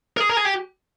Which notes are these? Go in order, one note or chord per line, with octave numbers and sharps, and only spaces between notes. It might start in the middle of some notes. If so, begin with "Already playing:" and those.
A#4
G#4
A#4
G#4
G4